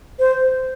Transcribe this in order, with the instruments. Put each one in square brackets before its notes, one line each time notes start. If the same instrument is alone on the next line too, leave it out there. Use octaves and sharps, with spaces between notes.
[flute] C5